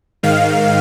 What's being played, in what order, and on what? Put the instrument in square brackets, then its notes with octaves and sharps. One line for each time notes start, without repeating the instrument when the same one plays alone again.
[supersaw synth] G#2 D#3 F5